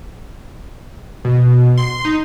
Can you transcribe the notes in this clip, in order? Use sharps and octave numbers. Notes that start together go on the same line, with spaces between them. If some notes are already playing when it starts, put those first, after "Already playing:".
B2
C6
D#4